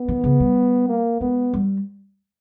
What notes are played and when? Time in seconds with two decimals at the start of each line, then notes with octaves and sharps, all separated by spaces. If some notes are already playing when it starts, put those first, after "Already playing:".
Already playing: B3
0.08 D#3
0.24 C#3
0.40 G3
0.89 A#3
1.20 G#3 B3
1.54 G3